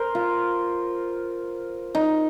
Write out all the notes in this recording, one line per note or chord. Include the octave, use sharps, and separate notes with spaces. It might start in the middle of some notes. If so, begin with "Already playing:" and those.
Already playing: A#4 C5
F4
D#4